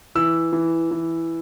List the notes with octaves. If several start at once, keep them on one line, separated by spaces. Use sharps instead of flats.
E3 E6
E3
E3